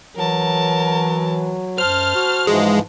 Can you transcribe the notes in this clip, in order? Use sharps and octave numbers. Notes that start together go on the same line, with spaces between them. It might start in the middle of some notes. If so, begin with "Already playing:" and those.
E3 F#3 A#4 A5
F#2 C5 A5 F6
F#4
G#2 E3 F3 G#3